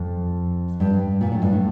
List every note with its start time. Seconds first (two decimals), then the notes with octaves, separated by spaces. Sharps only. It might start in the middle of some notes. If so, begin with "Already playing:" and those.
Already playing: F2
0.80 G2
1.21 A#2
1.32 A2
1.42 G2
1.53 A2